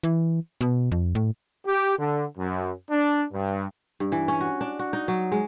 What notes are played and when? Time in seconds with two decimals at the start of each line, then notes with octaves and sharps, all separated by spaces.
0.03 E3
0.61 B2
0.92 F2
1.15 A2
1.65 G4
1.97 D3
2.37 F#2
2.90 D4
3.32 G2
4.00 G2
4.12 E3
4.28 C#4
4.41 F#4
4.61 D4
4.79 F#4
4.93 D#4
5.08 F#3
5.32 G#3